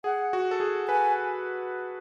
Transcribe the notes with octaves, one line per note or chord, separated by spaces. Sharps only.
G#4 F#5
F#4
A4
G#4
B4 G#5